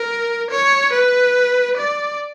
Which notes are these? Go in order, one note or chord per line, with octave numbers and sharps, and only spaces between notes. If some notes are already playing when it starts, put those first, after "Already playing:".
Already playing: A#4
C#5
B4
D5